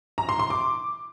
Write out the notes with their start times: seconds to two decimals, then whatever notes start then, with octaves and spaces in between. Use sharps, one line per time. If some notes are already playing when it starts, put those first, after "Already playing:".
0.18 A#5
0.29 C6
0.39 C6
0.50 D6